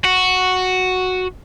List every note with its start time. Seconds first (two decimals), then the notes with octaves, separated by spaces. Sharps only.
0.05 F#4